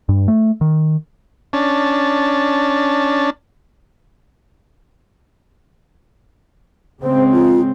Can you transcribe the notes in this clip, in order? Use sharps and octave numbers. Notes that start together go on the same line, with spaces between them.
G2
A3
D#3
C#4 D4 A5
C#3 G#3 C4 C5
F4